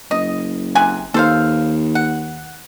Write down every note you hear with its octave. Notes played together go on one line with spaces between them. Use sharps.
F#1 D#5
C3 F#5 G#5
D#2 A4 C5 F5
F#5